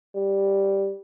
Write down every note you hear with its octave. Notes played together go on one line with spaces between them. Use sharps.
G3